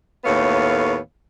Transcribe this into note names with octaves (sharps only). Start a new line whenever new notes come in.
D#2 A2 A3 B3 C#5 F5